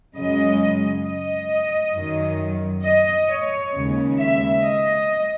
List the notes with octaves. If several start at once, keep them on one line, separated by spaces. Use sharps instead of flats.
F#2 C#3 G#3 D#5
D#5
F#2 D#3 F#3
D#5
C#5
D#2 C#3 G#3
E5
D#5